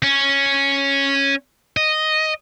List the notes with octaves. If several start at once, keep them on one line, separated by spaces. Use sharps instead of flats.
C#4
D#5